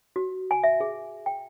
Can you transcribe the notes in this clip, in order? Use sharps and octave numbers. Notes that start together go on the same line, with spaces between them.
F#4
G#5
E5
G#4
G5